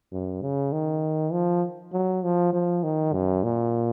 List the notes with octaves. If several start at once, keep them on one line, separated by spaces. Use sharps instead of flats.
F#2
C#3
D#3
F3
F#3
F3
F3
D#3
F#2
A#2